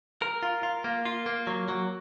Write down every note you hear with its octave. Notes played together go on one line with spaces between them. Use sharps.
A#4
F4
F4
A#3
F4
A#3
F#3
F#3